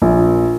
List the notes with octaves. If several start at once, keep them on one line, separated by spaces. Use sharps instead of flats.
A#1